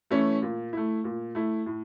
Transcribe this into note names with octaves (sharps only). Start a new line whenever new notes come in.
E3 A3 C#4 E4
A#2
A3 E4
A#2
A3 E4
A2